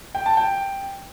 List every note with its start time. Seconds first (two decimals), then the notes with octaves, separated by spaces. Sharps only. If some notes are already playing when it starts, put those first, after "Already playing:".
0.15 G5
0.26 A5
0.37 G5